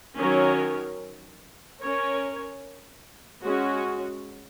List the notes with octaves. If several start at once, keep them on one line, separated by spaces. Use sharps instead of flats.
D#3 F#3 C#4 A#4 C#5
C#4 A#4 C#5
G#3 C#4 F#4